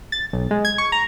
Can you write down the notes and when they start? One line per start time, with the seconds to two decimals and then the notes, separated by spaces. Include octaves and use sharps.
0.12 A6
0.33 B1
0.51 G#3
0.65 G#6
0.78 C#6
0.92 A#5